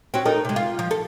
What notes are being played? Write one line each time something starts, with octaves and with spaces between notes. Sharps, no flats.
C4 C#4 F#4
D#4 A4 A#4
C3 G#3
F4
F3
A4